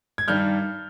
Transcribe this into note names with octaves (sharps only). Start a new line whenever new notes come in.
G#6
G2 D#3 G3 F6 G6